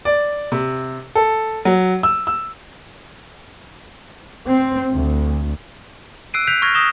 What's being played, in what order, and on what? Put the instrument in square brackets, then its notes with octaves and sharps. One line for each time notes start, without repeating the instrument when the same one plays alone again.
[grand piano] D5
C3
A4
F#3
E6
E6
[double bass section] C4
D2
[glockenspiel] E6 F#6 C7 D7 D#7
F#6 G6 B6 C7 F7
C#6 F6 G6 G#6 A#6
D#6 G6 A#6 E7 G7